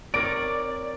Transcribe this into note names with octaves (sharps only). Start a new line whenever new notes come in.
C4 A#4 C#5 D5 D7